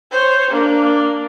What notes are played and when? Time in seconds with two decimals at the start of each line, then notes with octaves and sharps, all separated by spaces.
0.12 C5 C#5
0.51 A#3 D4